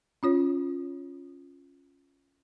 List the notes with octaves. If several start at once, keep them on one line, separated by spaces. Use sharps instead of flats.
C#4 F4 C#5